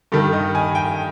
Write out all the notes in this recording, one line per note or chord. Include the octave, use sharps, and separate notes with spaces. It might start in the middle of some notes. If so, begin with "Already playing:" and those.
G2 D#3 A4
D#5
G#5
G5